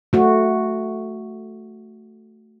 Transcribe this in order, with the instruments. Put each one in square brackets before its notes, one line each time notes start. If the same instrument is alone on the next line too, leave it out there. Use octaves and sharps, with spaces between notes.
[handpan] A3 F#4